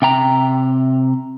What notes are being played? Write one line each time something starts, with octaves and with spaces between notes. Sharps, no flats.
C3 G5 A#5